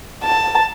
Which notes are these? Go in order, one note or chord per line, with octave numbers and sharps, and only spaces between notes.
A5